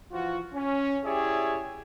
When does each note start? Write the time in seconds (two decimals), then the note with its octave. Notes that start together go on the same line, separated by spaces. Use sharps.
0.12 E3 F3 F4 F#4
0.54 C#4
1.04 E4 G4 G#4 C#5 D5 E5